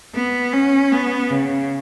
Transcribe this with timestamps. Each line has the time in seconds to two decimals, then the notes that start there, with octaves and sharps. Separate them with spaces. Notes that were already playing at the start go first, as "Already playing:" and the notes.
0.15 B3
0.53 C#4
0.92 B3
1.31 C#3